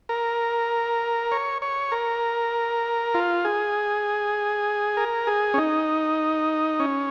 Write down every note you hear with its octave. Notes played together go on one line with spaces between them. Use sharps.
A#4
C#5
C#5
A#4
F4
G#4
A#4
G#4
C#4
D#4
C#4